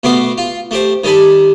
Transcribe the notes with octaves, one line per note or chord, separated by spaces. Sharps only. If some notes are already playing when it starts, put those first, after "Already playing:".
B2 A3 B3 C6 D6
F4
A3 G4 C5
D#3 G3 A4 G#5 B5